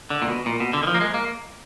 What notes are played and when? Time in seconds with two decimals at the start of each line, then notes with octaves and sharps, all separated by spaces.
0.10 D3
0.22 A#2
0.29 B2
0.46 A#2
0.60 B2
0.73 D3
0.83 D#3
0.87 F3
0.95 A#3
1.01 G#3
1.14 A#3